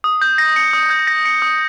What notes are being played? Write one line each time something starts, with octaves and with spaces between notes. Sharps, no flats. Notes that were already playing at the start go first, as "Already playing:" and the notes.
D#6
G6
A#6
C#7
D#6
G6
A#6
C#7
D#6